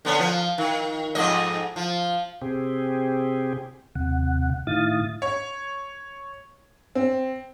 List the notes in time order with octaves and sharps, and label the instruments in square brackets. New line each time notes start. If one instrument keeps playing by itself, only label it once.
[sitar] D3 B3 C#4
F3
D#3
F2 G#2 D#5
F3
[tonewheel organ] C3 C4 G4 G#4
D#2 C3 F#5
A2 D#3 E4 F5 D#6 A6
[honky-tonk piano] C#5
C4